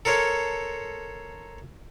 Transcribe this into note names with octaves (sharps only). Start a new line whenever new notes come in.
A4 A#4 C5 C#5